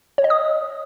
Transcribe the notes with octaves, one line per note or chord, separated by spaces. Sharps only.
C#5
D#5
D#6